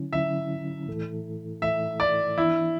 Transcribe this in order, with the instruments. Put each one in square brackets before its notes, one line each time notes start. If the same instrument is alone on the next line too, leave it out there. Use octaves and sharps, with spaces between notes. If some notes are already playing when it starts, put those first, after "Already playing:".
Already playing: [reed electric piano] D3 F#3 C#4 E4
[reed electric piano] D3 F#3 C#4 E4 [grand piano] E5
[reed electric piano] A2 E3 A3 E4 A4
[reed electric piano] A2 E3 A3 E4 A4 [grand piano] E5
[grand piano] D5
[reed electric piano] E3 B3 D4 [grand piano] E4